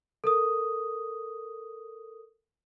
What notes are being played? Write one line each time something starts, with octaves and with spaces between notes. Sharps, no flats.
A4 A#4 D#6